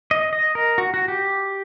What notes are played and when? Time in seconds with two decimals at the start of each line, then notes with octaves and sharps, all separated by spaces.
0.11 D#5
0.33 D#5
0.55 A#4
0.78 F#4
0.94 F#4
1.08 G4